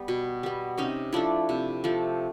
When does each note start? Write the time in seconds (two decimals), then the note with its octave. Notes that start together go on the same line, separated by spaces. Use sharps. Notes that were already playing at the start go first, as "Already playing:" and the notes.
Already playing: G3 B3
0.08 B2
0.43 G3 B3
0.78 C3 C#4 D#4
1.13 F3 A3 D4 E4
1.49 C3
1.84 F3 A3